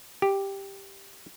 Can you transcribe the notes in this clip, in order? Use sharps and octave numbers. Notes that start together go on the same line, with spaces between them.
G4